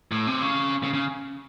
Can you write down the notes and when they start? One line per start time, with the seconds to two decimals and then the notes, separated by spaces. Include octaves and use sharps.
0.11 A2
0.27 C3
0.42 C#3
0.83 C#3
0.93 C#3